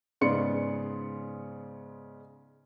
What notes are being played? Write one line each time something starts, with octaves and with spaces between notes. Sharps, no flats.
G#2 C#3 B3 D5 C6 C#7